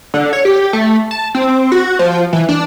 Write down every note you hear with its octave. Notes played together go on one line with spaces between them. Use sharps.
D3
C#5
G4
A3
A5
C4
F#4
F3
E3
D4